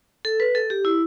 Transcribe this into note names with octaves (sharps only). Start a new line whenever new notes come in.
A4
B4
A4
G4
E4